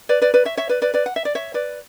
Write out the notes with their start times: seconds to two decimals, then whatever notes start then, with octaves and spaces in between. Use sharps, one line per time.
0.09 B4 D5
0.21 B4 D5
0.34 B4 D5
0.45 C#5 E5
0.57 C#5 E5
0.69 B4 D5
0.82 B4 D5
0.94 B4 D5
1.06 F#5
1.16 E5
1.25 D5
1.35 C#5 E5
1.54 B4 D5